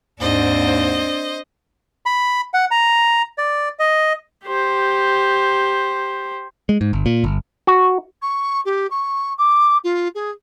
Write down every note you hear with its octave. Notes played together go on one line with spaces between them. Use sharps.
D#2 G#2 C4 D4 C5 D#5
B5
F#5
A#5
D5
D#5
G4 C5
G#3
G#2
G1
A#2
G1
F#4
C#6
G4
C#6
D6
F4
G#4